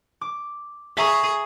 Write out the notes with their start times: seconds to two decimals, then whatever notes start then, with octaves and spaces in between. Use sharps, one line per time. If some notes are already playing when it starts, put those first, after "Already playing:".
0.21 D6
0.97 G#4 E5 A#5 C#6